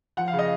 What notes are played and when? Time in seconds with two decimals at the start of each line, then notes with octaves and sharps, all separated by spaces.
0.17 F3 F#5
0.28 F5
0.33 C#3
0.39 D#5